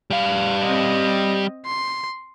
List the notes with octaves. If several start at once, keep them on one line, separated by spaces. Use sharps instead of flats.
G3 F5
C4 D#5
C6